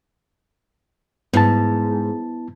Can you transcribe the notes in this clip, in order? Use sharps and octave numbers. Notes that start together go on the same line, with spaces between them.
G#2 B3 E4 A5